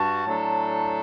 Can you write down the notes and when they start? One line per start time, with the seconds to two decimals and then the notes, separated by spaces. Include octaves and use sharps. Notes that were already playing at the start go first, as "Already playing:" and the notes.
Already playing: G2 F#4 A5
0.26 A2 F#3 A3 D4 A4